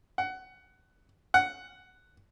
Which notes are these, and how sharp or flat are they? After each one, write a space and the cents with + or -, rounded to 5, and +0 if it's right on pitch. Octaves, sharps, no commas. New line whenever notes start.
F#5 +20
F#5 +10